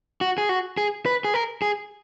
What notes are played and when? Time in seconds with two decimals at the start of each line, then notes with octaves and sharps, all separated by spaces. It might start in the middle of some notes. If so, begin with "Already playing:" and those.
0.21 F#4
0.38 G#4
0.49 F#4
0.77 G#4
1.06 B4
1.24 G#4
1.34 A#4
1.62 G#4